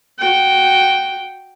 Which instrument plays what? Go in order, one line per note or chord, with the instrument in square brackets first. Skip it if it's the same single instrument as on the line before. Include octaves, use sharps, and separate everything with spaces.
[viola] F#4 G5